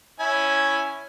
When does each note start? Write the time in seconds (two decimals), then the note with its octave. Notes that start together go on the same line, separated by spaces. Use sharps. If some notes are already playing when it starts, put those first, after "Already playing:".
0.20 C#4 E4 G#5